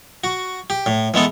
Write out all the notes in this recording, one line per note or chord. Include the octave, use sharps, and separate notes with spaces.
F#4
G4
A2
E3 G#3 B3 A4